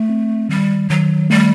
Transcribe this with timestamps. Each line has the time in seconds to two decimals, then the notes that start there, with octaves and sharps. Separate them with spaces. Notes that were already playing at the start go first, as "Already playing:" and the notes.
Already playing: A3
0.09 C4
0.49 D#3 G3
0.90 D#3 F#3
1.30 G3 A3